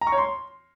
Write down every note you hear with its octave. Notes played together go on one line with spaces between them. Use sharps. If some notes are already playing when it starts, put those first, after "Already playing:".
A#5
C#6
C#5
C6